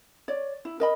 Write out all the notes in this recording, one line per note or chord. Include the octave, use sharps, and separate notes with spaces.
C#5 D5
E4
A#4 D#5 B5